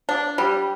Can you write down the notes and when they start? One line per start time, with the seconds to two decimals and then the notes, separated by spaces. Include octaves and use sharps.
0.09 D4
0.38 G3